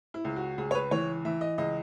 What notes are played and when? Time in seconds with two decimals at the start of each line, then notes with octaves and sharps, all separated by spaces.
0.14 E4
0.24 C#2
0.36 F#4
0.58 C#2 G#4
0.71 C#5
0.75 B4
0.91 E3 C#5
1.25 E3 E5
1.41 D#5
1.58 C#2 D#5